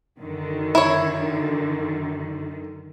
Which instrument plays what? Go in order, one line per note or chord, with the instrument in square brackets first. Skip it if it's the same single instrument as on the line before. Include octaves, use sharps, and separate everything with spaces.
[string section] F#2 D3 D#3
[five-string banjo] E4 C#5